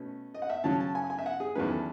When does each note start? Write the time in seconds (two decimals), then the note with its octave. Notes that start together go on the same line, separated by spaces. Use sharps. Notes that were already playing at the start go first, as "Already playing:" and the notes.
Already playing: B2 A3 C#4
0.34 D#5
0.42 F#5
0.50 E5
0.64 C#3 F#3 C#4 A5
0.80 A5
0.95 G#5
1.10 G#5
1.18 E5
1.26 F#5
1.40 G#4
1.55 E2 D#3 F#3 C#4 B4
1.71 A4